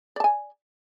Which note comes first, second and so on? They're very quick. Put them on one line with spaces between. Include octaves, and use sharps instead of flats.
D5 A5 G#5